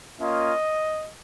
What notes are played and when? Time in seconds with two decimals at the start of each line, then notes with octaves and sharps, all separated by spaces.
0.20 A#3 C#4 F4 D#5